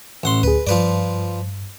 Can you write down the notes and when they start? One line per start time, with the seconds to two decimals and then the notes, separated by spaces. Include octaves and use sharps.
0.23 A1 F#5 C6
0.43 D2 G#4 B4
0.67 G2 F3 B4 D5